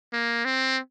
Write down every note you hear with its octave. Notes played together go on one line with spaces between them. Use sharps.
A#3
C4